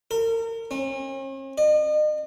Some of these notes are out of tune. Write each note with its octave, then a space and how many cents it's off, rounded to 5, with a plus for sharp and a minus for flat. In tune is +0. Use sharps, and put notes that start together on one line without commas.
A#4 -35
C#4 -45
D#5 -40